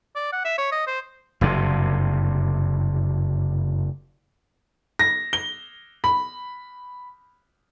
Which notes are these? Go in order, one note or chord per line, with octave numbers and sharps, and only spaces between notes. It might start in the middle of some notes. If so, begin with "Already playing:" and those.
D5
F#5
E5
C#5
D#5
C5
F#1 G2 C3
A#6
G7
B5